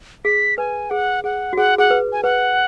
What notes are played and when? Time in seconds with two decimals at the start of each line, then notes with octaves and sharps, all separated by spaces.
0.25 G#4 B6
0.58 B4 G#5
0.90 G#4 F#5
1.24 G#4 F#5
1.53 F#4
1.57 G#4 F#5
1.78 G#4 F#5
1.91 B4
2.12 G#5
2.23 B4 F#5